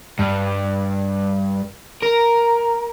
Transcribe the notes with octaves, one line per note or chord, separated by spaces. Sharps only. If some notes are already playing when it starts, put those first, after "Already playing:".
G2
A#4